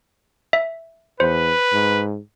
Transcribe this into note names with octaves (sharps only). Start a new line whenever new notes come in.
E5
E2 B4 C5
G#2